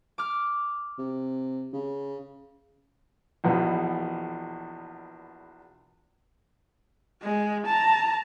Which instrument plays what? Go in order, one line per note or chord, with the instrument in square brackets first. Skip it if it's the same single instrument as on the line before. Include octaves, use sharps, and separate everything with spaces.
[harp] D6 F6
[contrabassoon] C3
C#3
[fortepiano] A#1 E2 B2
[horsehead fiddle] G#3
A5 A#5